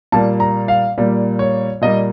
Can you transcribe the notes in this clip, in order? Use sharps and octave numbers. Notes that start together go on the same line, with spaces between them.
A#2 G3 A#3 A5
A#5
F5
A#2 G3 A#3
C#5
A#2 G3 A#3 D#5